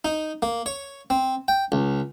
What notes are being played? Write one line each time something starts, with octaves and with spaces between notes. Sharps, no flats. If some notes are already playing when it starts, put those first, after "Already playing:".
D#4
A#3
C#5
C4
G5
C#2